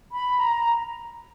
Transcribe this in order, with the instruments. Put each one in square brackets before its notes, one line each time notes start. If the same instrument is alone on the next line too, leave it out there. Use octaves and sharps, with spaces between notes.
[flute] B5
A#5